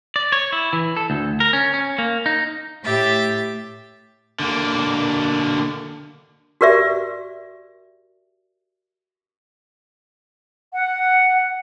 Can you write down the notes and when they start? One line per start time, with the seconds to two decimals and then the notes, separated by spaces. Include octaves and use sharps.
0.16 D5
0.32 C#5
0.52 E4
0.73 E3
0.97 A4
1.10 D2
1.40 A#4
1.53 C#4
1.74 C#4
1.98 A#3
2.26 D#4
2.84 A2 G4 E5 A6
4.40 D3 A#3
6.61 F#4 G4 A#4 D5 E5
10.74 F#5